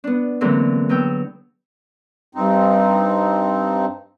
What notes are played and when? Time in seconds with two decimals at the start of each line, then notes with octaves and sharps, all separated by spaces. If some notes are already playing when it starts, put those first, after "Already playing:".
0.04 B3 D4
0.41 D3 E3 F#3 G#3 A#3 C4
0.89 F#3 B3 G5 E6
2.35 G2 C4 D#4